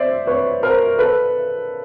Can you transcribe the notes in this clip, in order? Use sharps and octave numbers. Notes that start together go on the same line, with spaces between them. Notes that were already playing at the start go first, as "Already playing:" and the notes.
Already playing: C5 D5 E5
B4 C#5
A#4 C5
A4 B4